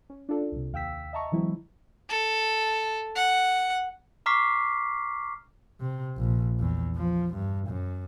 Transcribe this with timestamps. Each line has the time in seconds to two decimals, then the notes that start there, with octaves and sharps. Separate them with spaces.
0.10 C#4
0.29 D4 F4 A4 D5
0.52 C2 C3
0.73 D#2 F5 G5 E6 B6
1.13 D#5 E5 A5 A#5 C#6
1.32 D3 E3 F#3 G#3 C4 E4
2.09 A4
3.15 F#5
4.26 A#5 C#6 D6 F6 B6 C7
5.80 C3
6.17 A#1
6.59 E2
6.96 F3
7.34 G2
7.68 F#2